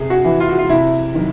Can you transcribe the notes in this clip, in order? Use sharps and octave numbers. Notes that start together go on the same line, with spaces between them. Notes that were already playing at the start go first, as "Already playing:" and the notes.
Already playing: C3 G#4
F#4
E3
F4
F#4
F4
C3 E4
D#3 F#3